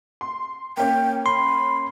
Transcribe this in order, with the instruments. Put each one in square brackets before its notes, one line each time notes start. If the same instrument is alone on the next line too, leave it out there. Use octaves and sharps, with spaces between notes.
[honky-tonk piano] C6
[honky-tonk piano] A#3 C#4 [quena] G5
[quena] B5 [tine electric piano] C6